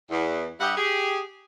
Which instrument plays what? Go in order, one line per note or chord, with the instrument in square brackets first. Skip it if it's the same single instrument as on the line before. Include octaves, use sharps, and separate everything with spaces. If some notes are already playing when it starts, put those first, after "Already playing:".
[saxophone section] E2
G2 G3 G4 D#5 E5 F#5
G4 G#4